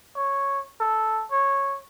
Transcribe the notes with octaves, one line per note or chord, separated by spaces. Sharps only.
C#5
A4
C#5